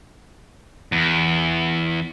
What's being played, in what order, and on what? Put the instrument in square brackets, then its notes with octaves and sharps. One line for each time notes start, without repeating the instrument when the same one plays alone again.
[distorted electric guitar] E2